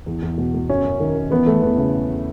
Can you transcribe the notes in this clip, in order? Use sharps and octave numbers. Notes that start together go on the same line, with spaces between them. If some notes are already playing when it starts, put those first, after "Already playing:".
E2
E2
B2
B2
F#2 C#4
F#2
D#3
D#3
E3 B3
E2 A3
E2 B3
C#3